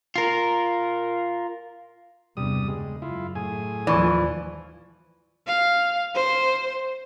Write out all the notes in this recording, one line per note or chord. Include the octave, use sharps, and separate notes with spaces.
F4 A#4
E2 G2 C3 G3 D#6
C#3 G#3
F#2 E4 F4
A2 G#4 G#5
D#2 E3 F3 D5 C#6
F5
C5